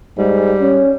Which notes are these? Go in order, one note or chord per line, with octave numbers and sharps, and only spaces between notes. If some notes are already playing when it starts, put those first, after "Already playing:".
G#2 G3
C#4